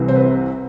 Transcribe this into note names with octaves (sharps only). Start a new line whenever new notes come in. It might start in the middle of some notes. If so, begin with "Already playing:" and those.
Already playing: C2 C3 E3
C5
B4